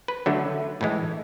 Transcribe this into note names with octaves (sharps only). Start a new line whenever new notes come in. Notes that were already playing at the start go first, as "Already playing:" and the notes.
B4
D3 F#3 A3
A2 E3 G#3